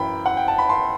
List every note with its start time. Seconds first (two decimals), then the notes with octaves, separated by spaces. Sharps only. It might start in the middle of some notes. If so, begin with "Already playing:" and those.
Already playing: F#2 E3 G5 B5
0.26 F#5
0.37 G5
0.48 A5
0.58 B5
0.69 A5 C6